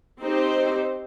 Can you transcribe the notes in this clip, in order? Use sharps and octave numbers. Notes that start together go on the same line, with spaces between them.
C4 D#4 G4 C5